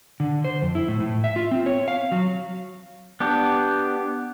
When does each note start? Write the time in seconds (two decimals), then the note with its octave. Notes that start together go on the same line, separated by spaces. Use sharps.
0.20 D3
0.45 C5
0.62 F2
0.75 E4
0.88 A2
1.00 A2
1.24 E5
1.36 F4
1.51 C4
1.66 C#5
1.88 F5
2.12 F#3
3.20 B3 D4 G4